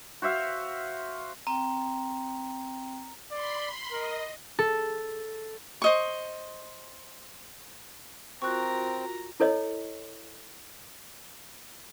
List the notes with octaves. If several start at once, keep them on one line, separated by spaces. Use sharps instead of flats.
F#4 C5 E5 F5
C4 G5 A#5
D5 B5 C6
A#4 D#5
A4
C5 D#5 C#6
C4 F4 F#4 A#4 A#5 C#6 F#6
E4 A4 C#5 D#5